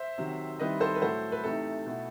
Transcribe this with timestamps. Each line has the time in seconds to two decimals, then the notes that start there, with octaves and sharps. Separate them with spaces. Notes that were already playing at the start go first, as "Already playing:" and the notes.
Already playing: C5 E5
0.18 C3 D#3 F#3
0.59 D#3 G3 C4 E4 B4 D#5
0.80 A4 C5
0.96 B4
1.02 A2 F#3 A3 A4 C5
1.32 B4
1.44 C3 E3 A3 D#4 A4
1.86 B2 A3 E4